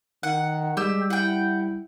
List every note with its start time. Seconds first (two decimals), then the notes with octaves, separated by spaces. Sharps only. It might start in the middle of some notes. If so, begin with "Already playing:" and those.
0.23 D#3 F#5
0.77 G3 G#3 G4 E6
1.10 E4 F#5 G5